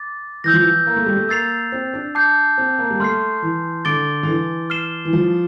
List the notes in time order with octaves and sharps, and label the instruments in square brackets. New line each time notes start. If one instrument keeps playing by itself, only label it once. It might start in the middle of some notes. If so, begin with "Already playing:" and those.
Already playing: [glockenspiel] D6 A6
[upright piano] E3 [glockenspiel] E6 G6 A#6
[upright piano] F3
E3
A#3
A3
G3
A3
[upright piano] A#3 [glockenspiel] E6 A6 C7 F7
[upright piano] C4
D4
[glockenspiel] A5 D6 G6 C7
[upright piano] C4
A#3
G3
[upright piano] A3 [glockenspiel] C6 F6 C7
[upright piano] E3
[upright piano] D3 [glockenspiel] D6 A6 D7 G7
[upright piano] D3
E3
[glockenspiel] F6 C7 E7 G7
[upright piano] E3
F3